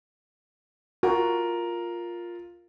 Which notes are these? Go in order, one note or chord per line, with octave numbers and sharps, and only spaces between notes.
F4 F#4 A#4